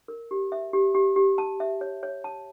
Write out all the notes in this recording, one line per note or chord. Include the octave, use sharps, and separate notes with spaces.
A#4
G4
E5
G4
G4
G4
A5
E5
C#5
C#5
A5